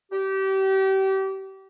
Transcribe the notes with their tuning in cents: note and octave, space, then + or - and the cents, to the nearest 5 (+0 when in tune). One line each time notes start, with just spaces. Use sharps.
G4 -30